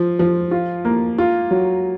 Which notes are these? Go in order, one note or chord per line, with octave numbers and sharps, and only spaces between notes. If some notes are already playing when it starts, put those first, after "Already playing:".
Already playing: F3
F3
F4
A#3
F4
F#3